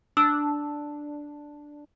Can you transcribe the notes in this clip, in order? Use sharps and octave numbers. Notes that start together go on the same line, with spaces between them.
D4 E6